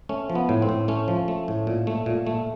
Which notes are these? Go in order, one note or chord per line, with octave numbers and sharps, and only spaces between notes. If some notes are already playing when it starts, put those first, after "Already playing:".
A3 C#4
F3
B3
A2
C4
A2
A3 C#4
F3
A3
A2
A#2
A3
A#2
A3